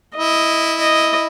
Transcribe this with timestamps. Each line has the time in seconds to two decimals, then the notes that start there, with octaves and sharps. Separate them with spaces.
0.15 E4 D#5
0.81 D#5